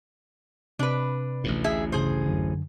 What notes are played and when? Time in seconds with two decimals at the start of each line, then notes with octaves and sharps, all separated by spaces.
0.79 C3 D4 B4
1.44 A1 D2 A2
1.64 G#4 E5
1.92 G2 C#3 G#4 C5
2.25 F#2 D3